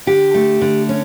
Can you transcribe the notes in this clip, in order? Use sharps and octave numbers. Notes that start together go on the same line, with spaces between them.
D3 G4
A3
D3
C#4